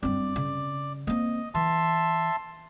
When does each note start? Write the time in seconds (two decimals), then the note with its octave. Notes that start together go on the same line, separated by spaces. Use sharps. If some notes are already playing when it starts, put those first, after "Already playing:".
0.03 G2 C4 D5
0.36 C#3
1.07 A#3 C4 D#5
1.55 E3 E5 A5 C6